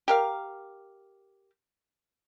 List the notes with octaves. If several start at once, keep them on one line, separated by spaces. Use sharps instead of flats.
G4 A#4 F5